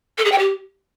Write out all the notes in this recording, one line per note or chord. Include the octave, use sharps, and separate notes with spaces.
A4
G#4
G5
G4